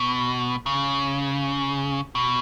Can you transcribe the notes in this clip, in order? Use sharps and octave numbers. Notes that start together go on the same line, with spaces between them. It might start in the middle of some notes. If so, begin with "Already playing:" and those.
Already playing: B2
C#3
B2